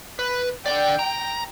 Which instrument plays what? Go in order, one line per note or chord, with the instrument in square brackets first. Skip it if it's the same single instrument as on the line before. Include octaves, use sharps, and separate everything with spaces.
[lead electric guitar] B4
[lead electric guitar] D3 D5 [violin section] G5
[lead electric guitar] A#5